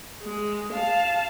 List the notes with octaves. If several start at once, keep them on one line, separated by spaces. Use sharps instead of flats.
G#3
F5 A5